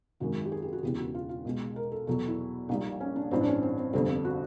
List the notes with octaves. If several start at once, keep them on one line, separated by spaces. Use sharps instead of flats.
G#1 F#2 D#3 G#3 F#4
G4
G#4
G4
F#4
E1 E2 C#3 E3 G4
F#4
F4
F4
B1 B2 G#3
A#4
A4
E2 B2 F#3 A4
E4
A#1 A#2 G3 D#4
C#4
D4
A1 G2 E3 C4
D4
C#4
C4
C4
G1 F2 D3 G3 C4
C4
F#4